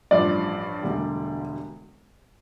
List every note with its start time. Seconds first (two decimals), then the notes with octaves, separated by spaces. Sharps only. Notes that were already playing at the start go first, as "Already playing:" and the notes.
0.11 A1 G2 F3 D5
0.83 E1 D2 D3 G3